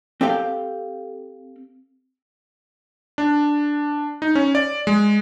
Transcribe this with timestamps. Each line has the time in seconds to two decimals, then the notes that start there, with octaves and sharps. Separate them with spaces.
0.21 C4 G4 A4 F5 G5
3.18 D4
4.22 D#4
4.35 C#4
4.55 D5
4.87 G#3